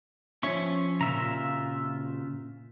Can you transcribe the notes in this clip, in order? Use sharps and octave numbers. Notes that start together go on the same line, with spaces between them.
F3 C#4 C#5 E5 C#6
A#2 C#3 F4 E5 A#5